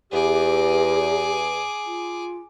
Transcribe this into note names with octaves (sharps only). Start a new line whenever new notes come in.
E2 G4 G#4 D6
F4